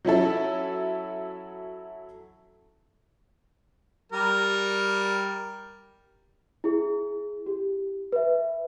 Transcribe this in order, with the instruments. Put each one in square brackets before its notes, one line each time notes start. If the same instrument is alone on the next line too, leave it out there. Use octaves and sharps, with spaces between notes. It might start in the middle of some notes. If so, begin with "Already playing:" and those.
[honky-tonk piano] F#3 C#4 E4 A4
[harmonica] G3 A#4
[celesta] E4 G#4
G4
B4 E5